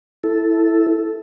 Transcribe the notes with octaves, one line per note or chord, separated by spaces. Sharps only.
E4 A4